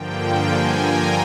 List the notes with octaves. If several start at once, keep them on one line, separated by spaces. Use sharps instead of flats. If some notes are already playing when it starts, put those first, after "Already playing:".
Already playing: G2 D3 F3 A#3 G5
G#5
A#5